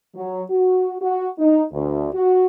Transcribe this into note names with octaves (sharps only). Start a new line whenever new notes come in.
F#3
F#4
F#4
D#4
D2
F#4